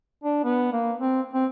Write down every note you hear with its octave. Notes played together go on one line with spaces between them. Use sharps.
D4
B3
A#3
C4
C4